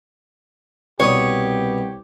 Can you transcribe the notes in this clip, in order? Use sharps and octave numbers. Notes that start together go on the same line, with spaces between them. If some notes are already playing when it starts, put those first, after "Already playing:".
C2 B2 B3 G4 C#5 D#6